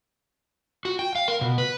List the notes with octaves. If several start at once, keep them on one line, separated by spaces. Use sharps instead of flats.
F#4
G5
F5
A#4
B2
B4